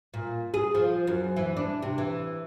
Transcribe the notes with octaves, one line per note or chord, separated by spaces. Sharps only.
A#2
G#4
F3
F#2
E3
D4
C3
E3